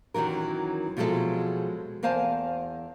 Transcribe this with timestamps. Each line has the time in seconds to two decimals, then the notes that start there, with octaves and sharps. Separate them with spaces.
0.14 F#2 D#3 E3 F#3 A#4
0.97 B2 F3 F#3 G#3 A4 E5
2.03 E2 A#4 C5 F5 G#5 A5